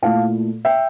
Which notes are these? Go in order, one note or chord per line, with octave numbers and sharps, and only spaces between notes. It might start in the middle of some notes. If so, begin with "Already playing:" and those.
A#2 A3 E4 F5 A5
E5 G5